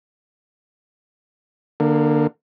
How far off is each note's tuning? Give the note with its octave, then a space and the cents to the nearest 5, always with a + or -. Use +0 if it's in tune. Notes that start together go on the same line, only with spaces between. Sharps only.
D3 +25 A#3 +0